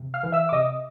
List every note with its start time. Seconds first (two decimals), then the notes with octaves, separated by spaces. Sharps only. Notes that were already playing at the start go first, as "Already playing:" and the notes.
Already playing: C3
0.14 F5 F6
0.23 E3
0.32 E5 E6
0.49 D6
0.52 C3 D#5 D#6